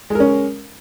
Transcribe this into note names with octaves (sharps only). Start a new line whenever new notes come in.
G#3 C#4 A#4